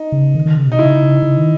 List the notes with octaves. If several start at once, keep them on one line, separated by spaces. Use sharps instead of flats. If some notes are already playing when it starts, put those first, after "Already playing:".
Already playing: D#4
C#3
D#3
D#3
C#3
B2 D#4
C#3 E4
C#3
D#3